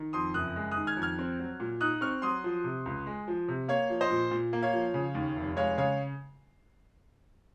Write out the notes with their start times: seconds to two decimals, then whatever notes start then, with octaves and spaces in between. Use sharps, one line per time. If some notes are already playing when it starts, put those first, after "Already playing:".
Already playing: D#3
0.13 F2 C6 D#6
0.34 F#1 D#6 F#6
0.56 G#3
0.71 D#3 D#6 F#6
0.87 F6 G#6
0.97 F2
1.02 F6 G#6
1.19 C4
1.39 F#3
1.60 A#2
1.81 D#4 D#6 F#6
2.01 C4 C#6 F6
2.22 F#3 C6 D#6
2.44 F3
2.64 C3
2.86 C#2
3.07 G#3
3.28 F3
3.48 C3
3.68 A#3 C#5 F5
3.90 F3
4.01 C5 D#5
4.10 A#2
4.31 A#2
4.53 A#3
4.63 C#5 F5
4.73 F3
4.94 C#3
5.15 D#2
5.36 F1
5.56 G#3 C#5 F5
5.78 C#3 C#5 F5